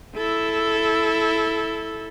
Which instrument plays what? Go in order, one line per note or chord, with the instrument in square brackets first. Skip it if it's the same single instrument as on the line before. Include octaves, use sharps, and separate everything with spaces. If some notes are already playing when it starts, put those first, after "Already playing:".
[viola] E4 A4